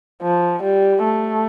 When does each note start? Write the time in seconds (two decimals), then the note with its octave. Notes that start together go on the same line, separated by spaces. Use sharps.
0.22 F3
0.63 G3
1.04 A3